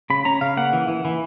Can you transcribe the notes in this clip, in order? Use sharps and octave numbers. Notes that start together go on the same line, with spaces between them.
C#3 B5
C#4 A#5
C#3 F5
A#3 F#5
E3
E3
E3